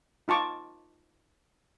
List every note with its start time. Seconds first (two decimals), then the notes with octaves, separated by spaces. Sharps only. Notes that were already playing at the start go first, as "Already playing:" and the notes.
0.28 D#4 F4 A5 C#6 D6